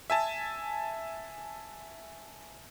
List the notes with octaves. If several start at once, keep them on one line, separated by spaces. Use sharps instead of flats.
E5 G#5 A5